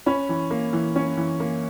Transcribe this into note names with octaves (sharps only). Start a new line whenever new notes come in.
C#4 B5
E3
A#3
E3
C#4
E3
A#3